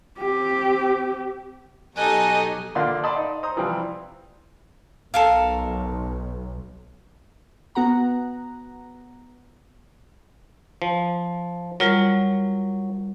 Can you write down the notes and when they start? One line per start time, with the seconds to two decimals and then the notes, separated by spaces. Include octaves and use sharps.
0.19 C4 G4
1.96 B2 F#3 D#4 G4 A4 D#5 G#5 F#6
2.75 A#2 D3 A#3 D5 C6
3.04 D5 D#5 A5 B5 C6
3.16 D#4
3.43 C5 A#5 D#6
3.56 C3 E3 F3 G3 C4
5.14 B1 A4 A#4 F5
7.75 B3 F#4 F#5 A#5
10.82 F3
11.80 F#3 G3 F4 A#4